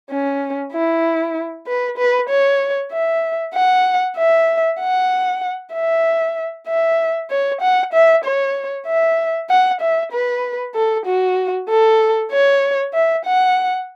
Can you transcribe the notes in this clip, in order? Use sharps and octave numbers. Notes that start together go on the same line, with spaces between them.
C#4
E4
B4
B4
C#5
E5
F#5
E5
F#5
E5
E5
C#5
F#5
E5
C#5
E5
F#5
E5
B4
A4
F#4
A4
C#5
E5
F#5